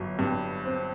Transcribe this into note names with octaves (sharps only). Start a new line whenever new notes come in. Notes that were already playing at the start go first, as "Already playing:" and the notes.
Already playing: G1 F#3
G2
C4